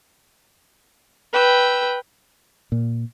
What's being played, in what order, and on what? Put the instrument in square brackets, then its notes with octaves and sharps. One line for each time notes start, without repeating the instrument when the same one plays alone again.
[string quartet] B4 G5 E6
[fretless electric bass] A#2